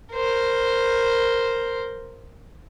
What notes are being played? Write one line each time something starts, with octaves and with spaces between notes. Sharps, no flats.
A#4 C5